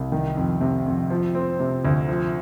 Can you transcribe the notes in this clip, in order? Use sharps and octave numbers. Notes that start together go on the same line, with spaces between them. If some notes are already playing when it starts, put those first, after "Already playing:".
Already playing: C2
D#3
F2
C3
F2
F3
C4
C3
D2
F3